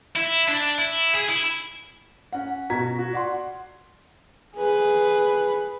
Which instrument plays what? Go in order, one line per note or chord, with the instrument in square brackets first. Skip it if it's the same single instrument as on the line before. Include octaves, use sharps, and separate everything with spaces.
[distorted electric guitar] E4
D4
E4
G#4
E4
[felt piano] C#4 F#5
B2 F#4 A#5 G#6 B6
F#4
D5 F#5 C6
[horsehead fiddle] G#4 B4